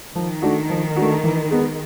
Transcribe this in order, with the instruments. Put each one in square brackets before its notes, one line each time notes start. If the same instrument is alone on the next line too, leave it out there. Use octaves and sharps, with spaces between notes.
[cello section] D#3 [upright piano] F3
[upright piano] A3 D4 F#4
F3
A3 D4 F#4
E3
G#3 B3